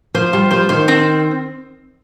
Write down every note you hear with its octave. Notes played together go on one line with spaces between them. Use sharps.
F3 C5
G3 F4
F3 C5
D#3 C5
C4